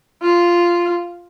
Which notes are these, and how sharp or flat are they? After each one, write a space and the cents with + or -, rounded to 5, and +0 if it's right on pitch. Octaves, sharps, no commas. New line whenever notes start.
F4 -5